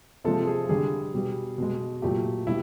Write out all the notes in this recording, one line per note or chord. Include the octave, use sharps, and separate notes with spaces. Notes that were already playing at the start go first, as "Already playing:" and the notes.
C3 F3 G#3 A4
G#4
D3 G3 G#4
B2 G3
B2 G#3
A#2 F#3 A3 G4
B2 G3 E4